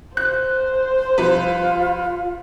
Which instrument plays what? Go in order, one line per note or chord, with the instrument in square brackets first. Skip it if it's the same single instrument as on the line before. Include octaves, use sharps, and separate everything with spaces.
[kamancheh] C5 [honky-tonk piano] F#6
[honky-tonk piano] C2 F3 B4 [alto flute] F4